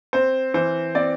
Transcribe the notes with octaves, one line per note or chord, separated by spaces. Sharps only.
C4 C5
E3 C5
C4 D5